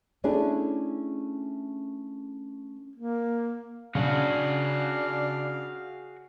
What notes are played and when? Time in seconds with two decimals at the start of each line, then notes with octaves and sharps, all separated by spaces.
0.24 A3 C#4 D4 E4 G#4
2.96 A#3
3.95 C#3 D4 F#4 G#4 C#5 F5